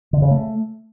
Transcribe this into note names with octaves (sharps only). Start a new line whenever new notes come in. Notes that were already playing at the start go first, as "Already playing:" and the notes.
D3
C#3
A3